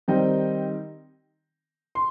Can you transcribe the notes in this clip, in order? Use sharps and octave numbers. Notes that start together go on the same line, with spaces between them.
D#3 G3 C4 D#4 D#5 G5
C6